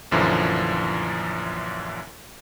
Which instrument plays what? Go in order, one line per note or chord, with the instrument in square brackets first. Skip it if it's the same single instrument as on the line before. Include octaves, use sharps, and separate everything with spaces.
[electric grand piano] A#1 F#2 D3 E3 F3